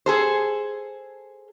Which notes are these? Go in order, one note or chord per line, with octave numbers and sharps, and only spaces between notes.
G#4 A4 C5